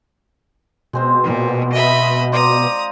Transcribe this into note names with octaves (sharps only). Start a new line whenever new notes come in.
B2 G#3 C4 C5
A#2
D#5 E5 B5
F4 C5 D5 A#5 D#6